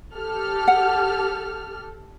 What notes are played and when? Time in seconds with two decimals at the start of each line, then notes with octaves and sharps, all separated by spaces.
0.15 G4 A4 F6
0.68 F#5